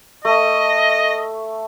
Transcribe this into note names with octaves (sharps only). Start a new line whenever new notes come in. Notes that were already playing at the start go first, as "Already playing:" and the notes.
A3 D#5